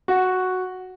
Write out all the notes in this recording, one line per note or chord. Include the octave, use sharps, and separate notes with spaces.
F#4